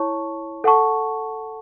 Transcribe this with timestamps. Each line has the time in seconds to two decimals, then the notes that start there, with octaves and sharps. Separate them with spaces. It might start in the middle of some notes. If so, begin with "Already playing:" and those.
Already playing: E4 C#5 A5 C#6
0.64 A4 F#5 A5 C#6